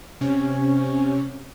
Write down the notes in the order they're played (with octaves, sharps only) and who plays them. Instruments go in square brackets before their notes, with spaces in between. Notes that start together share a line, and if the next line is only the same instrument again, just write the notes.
[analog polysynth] C3 C#4